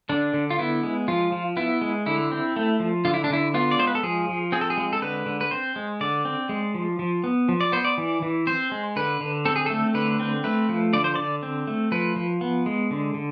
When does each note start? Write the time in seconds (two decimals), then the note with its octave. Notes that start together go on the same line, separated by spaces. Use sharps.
0.09 D3 D4
0.34 D3
0.50 F4
0.58 B3 E4
0.83 G#3
1.08 F3 F4
1.32 F3
1.57 B3 E4
1.81 G#3
2.06 D3 E4
2.32 C4
2.56 A3
2.80 F3
3.05 D3 F4
3.14 E4
3.24 D4
3.30 D3 E4
3.54 B3 F4
3.71 D5
3.79 G#3 C5
3.87 B4
3.95 A4
4.03 F3 G#4
4.29 F3
4.52 C4 G#4
4.61 A4
4.70 G#4
4.77 G#3
4.93 A4
5.02 D3 B4
5.26 D3
5.41 B4
5.51 C4 C5
5.76 G#3
6.01 D3 D5
6.25 C4
6.49 G#3
6.75 F3
6.99 F3
7.24 B3
7.49 F3
7.61 D5
7.72 B3 C5
7.85 D5
7.98 E3
8.22 E3
8.47 C4 C5
8.72 G#3
8.96 D3 B4
9.21 D3
9.46 C4 A4
9.56 G#4
9.66 A3 A4
9.94 D3 B4
10.20 C4
10.44 A3 B4
10.69 F3
10.93 D3 D5
11.04 C5
11.15 D3 D5
11.43 C4
11.67 A3
11.92 F3 B4
12.16 F3
12.41 B3
12.66 G#3
12.91 D3
13.14 D3